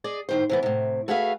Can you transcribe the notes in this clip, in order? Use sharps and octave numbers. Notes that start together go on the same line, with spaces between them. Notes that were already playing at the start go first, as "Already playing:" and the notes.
G#4 D5 D#5
A2 D#3 C5
C3 E3 B3
A2 C3
A3 F#4 G#4 B4 E5 F5